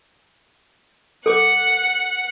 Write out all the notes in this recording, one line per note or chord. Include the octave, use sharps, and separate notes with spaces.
A4 F#5 D6